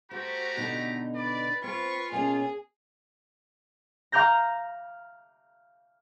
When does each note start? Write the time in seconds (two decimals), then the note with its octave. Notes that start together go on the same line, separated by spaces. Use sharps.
0.11 A3 F#4 G4 C5 A#5
0.57 B2 D3 D#4
1.15 B4 D5
1.64 C4 F4 B4 C#6
2.12 B2 A#3 C#4 G#4 G#5
4.12 F5 A#5 D6 F6 G6 A#6